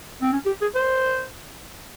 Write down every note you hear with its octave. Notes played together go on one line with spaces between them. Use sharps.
C4
C#4
G4
G#4
C5